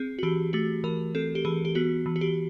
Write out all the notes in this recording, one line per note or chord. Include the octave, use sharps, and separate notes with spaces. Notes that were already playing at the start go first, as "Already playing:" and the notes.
Already playing: C4 G#4
F#4
E3 G4
A3 F#4
E3 A#4
C4 A4
G4
E3 G#4
G4
B3 F#4
E3
F#4
G4